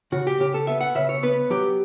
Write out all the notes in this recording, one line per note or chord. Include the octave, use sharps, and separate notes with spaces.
C#3 F#4
G4
C#3 G4
A4
B3 E5
F#5
C#3 E5
C#5
B3 B4
F#3 G4